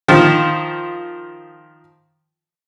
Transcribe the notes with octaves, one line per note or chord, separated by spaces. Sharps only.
D#3 F3